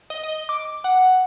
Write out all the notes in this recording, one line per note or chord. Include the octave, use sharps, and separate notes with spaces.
D#5
D#5
D6
F#5